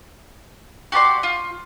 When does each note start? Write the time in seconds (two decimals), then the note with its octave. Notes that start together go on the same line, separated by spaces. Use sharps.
0.92 F#4 G4 D5 C6
1.23 F4